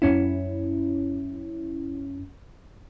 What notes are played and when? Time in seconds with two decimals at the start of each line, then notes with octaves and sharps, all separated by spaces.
0.02 F#2 C#4 E4